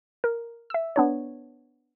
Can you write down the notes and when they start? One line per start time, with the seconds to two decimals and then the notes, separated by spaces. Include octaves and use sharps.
0.24 A#4
0.70 E5 E6
0.96 B3 D4 C#5